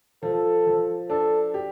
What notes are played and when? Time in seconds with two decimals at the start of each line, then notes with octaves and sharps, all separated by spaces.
0.23 F3 A4
0.67 F3
1.10 D4 A4
1.54 G4